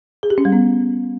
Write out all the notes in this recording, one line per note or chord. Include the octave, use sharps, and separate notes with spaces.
G#4
G4
C#4
G3
B3